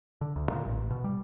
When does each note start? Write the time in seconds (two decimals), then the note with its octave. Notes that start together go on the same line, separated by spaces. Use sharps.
0.21 D3
0.36 D2
0.50 A#2
0.66 A1
0.90 B2
1.04 G3